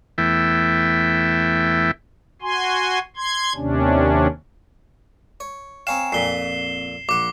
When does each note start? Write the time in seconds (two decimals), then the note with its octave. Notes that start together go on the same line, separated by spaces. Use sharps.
0.18 E2 E3 A3 E5 G5
2.42 F#4 G#5 C6
3.16 C6 G#6
3.55 D#2 C3 C#4 D4
5.40 C#5
5.87 C4 C#5 F5 G5 G#5 A#5 E7
6.12 F2 A#2 C4 B6 C7 G7
7.09 A#1 F#5 D6